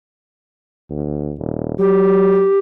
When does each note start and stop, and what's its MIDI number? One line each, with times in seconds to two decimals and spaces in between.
0.90 1.33 38
1.39 1.75 27
1.79 2.45 54
1.79 2.59 67